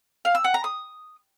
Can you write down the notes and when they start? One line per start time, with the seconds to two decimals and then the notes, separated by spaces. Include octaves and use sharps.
0.25 F5
0.35 E6
0.44 F#5
0.54 A#5
0.64 D#6